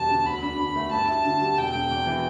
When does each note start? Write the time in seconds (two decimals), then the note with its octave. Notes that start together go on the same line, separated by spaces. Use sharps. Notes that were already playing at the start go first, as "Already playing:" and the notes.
Already playing: E1 E2 G3 A5
0.10 D3
0.26 D2 B5
0.43 D4
0.59 D3
0.76 A3
0.92 G2 A5
1.08 E4
1.25 D3
1.41 G3
1.57 E1 G5
1.74 E1
1.91 E2
2.07 E3